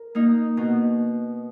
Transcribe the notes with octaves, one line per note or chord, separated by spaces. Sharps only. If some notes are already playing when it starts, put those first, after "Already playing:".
Already playing: A#4
A#3 D#4
B2